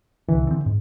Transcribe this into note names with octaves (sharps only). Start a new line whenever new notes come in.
C2 D3 E3
D3 C4
G#2